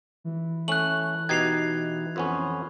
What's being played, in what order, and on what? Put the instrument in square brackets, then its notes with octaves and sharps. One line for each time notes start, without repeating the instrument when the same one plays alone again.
[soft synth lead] E3
[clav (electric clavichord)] A3 C#4 [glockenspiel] F#6 F#7
[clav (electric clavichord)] B2 D#4 G4 [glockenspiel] G#6 C7 F7
[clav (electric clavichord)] F2 B3 C#4